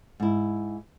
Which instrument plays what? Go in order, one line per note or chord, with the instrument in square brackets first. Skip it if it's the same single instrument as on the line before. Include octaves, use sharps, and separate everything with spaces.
[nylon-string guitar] G#2 E4